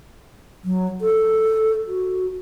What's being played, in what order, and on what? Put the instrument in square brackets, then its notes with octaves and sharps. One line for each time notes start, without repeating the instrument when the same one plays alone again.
[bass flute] F#3
A4
F#4